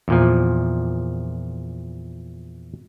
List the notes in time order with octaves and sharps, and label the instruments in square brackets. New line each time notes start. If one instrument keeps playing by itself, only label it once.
[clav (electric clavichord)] E2 A#2 F3